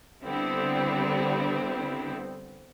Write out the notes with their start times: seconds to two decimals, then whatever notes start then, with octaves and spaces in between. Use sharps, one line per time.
0.24 D3 G3 B3 C4 E4